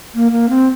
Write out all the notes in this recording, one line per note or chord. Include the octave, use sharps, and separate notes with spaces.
A#3
A#3
C4